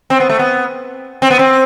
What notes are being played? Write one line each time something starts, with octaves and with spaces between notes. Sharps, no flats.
C4
B3
A3
B3
C4
B3
C4